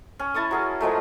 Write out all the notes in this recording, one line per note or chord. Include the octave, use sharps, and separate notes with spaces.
C#4
E4 A5 C#6 D#6
F#3 G#4 A#4
F3 F#3 G#3 A3